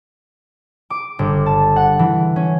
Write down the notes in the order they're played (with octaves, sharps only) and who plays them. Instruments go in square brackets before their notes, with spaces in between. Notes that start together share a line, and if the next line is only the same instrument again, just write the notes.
[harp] D6
G1
A5
F#5
E3
C#4